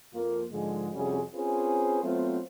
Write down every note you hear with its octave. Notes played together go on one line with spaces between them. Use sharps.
F2 F3 A#3
G#2 D3 F3 G#3
F2 C3 G3 C#4 F#4 G#4
C4 C#4 F4 G#4 B4 C5
F#3 A3 B3 C4 F4 C5